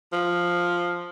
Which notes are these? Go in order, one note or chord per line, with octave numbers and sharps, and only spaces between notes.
F3